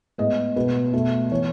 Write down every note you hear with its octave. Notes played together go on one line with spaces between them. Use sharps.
A2 G#3 B3 D#5
B2 G#3 B3 B4
B2 A3
E3 B3 C#5